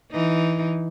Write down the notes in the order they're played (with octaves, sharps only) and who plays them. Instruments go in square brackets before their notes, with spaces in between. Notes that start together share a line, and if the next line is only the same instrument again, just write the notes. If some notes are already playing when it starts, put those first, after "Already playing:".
[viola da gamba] E3 D#4